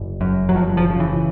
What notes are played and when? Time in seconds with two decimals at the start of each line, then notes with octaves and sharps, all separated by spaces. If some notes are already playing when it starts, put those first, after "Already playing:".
Already playing: F#1
0.21 F#2
0.49 F#3
0.55 F#1 F3
0.77 F3
0.90 C#3
1.00 E3